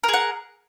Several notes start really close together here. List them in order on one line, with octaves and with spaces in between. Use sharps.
A#4 G#4 F#5